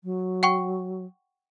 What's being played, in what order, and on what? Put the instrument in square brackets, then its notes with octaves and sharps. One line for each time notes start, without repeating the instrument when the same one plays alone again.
[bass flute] F#3
[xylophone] F#5 G5 C#6